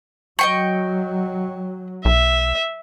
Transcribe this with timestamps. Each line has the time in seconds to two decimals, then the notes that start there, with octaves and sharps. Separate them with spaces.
0.39 F#3 D#5 G5 C#6
2.05 B1 E5